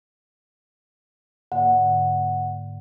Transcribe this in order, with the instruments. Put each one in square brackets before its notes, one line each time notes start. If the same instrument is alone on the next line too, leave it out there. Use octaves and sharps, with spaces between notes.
[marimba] G#2 D3 A#3 [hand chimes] F#5